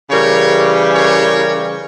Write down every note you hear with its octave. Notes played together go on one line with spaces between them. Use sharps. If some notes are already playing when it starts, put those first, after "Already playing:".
C#3 E3 G3 A#4 C#5
A#4 C#5